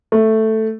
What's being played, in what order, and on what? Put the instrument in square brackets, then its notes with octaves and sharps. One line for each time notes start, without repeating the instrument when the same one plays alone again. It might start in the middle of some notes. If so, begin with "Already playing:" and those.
[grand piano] A3